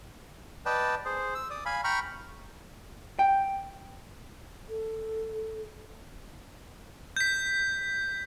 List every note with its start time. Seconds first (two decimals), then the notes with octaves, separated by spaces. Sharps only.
0.66 B4 D5 D#5 G5 A5
1.05 G#4 C5
1.35 E6
1.50 D5 D#6
1.65 F5 G#5 B5
1.84 G5 A#5 B5 C#6 F6
3.19 G5
4.69 A4
7.16 G6 B6